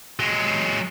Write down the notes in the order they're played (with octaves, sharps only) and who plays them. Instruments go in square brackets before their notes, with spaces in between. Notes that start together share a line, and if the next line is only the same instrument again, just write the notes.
[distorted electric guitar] F#3 G#3